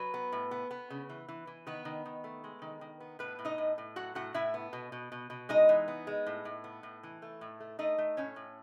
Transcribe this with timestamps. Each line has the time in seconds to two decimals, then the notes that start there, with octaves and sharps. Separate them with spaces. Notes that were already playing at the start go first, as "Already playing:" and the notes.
Already playing: F#3 B4
0.14 B3
0.32 A2
0.51 B3
0.71 B3
0.90 C#3
1.09 E3
1.29 E3
1.47 E3
1.67 D#3 B3 B4
1.85 D#3
2.05 D#3
2.24 A3
2.44 G#3
2.62 D#3
2.81 D#3
3.00 B3
3.19 A2 B3 B4
3.39 A2
3.45 D#4 D#5
3.58 A2
3.78 A2
3.96 F#3 F#4 F#5
4.15 A2 F#4 F#5
4.34 A2 E4 E5
4.54 B3
4.73 B2
4.92 B2
5.12 B2
5.30 B2
5.49 G#3 D#4 D#5
5.69 E3
5.88 B3
6.07 G#3
6.26 A2
6.45 A2
6.64 B3
6.83 A2
7.03 E3
7.22 A3
7.41 A2
7.60 A3
7.79 A3 D#4 D#5
7.98 A3
8.17 A2 C#4 C#5
8.36 A2